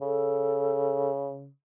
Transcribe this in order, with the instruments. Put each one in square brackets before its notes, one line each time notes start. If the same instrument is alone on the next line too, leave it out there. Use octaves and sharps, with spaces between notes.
[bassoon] C#3 [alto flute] A4